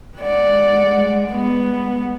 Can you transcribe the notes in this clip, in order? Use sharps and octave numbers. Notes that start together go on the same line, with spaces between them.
G#3 D5 F#5
B3